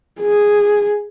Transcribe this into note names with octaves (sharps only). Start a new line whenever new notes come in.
G#4